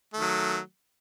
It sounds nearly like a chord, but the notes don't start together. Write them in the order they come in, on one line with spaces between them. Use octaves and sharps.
A3 D#3 F#3